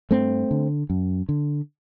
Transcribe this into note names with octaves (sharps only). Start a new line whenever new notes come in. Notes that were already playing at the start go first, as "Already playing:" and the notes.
G2 A3 C4
D3
F#2
D3